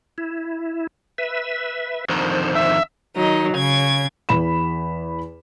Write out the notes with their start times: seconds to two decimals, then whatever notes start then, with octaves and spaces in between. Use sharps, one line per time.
0.18 E4
1.18 B4 E5
2.09 F2 D3 D#3 C5
2.56 E5
3.16 D#3 F#3 D#4
3.54 C#3 G#6
4.29 E2 B5 E7